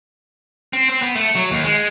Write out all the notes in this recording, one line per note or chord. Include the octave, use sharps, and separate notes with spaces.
C4
C4
B3
A3
F#3
D#2
G#3